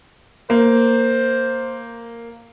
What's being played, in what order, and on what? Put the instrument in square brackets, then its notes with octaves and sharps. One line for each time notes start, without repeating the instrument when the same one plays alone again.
[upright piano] A#3 [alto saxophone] C5